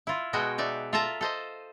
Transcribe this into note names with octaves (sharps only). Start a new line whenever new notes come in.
E4 F4
B2 G#3 F#4 D#5 G5 G#5
D#4 D5 E5
F4 A4 E5 F5 A5 A#5
A4 C5 D#5